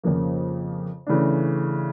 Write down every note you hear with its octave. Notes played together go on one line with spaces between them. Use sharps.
F2 C#3 F3 A#3
C#3 E3 A3 D4